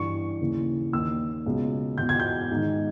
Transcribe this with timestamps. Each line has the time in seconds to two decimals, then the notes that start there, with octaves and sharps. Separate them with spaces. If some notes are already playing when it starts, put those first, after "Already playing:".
Already playing: G2 E3 C#6
0.41 D#2 C#3 E3
0.93 D#2 D#3 E6
1.46 C#2 B2
1.98 E2 B2 G6
2.09 G#6
2.20 G6
2.51 G#2 D#3